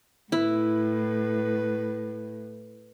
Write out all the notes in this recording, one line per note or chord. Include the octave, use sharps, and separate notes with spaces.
A2 E4 B4